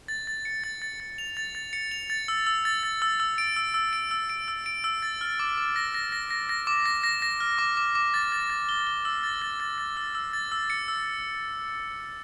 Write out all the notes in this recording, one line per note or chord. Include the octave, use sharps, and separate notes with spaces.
A6
A6
C#7
A6
A6
A6
F7
A6
A6
C#7
F7
A6
E6
E6
A6
A6
E6
E6
D7
E6
E6
D7
E6
D7
E6
D7
E6
A6
F6
D6
D6
A#6
A#6
A#6
A#6
A#6
D6
A#6
A#6
A#6
F6
D6
D6
D6
A6
A6
A6
G7
G7
E6
A6
A6
A6
A6
E6
E6
A6
E6
C#7
E6